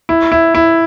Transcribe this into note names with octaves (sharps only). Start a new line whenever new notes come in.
E4
E4
E4